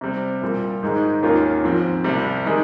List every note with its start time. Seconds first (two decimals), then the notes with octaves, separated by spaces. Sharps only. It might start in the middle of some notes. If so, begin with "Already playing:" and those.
0.01 C3 G3 C4
0.41 C2 A#2 G3
0.82 G#2 D#3 G#3 D#4 G#4
1.22 D#2 D#3 A#3 C#4 F4
1.64 G#2 F3 C4
2.04 C2 C3 G3
2.45 D#3 G#3 D#4